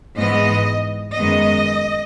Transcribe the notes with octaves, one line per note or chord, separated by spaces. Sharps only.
G#2 E3 B3 D#5
F#2 D#3 G#3 B3 D#5